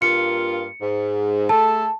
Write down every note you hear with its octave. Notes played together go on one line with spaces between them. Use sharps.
G2 A#3 F4 C#7
G#2
A3 G#4 A4 A5